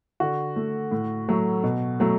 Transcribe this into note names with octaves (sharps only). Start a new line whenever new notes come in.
D3 F#4
A3
A2
F#3 A3
B2
F#3 A3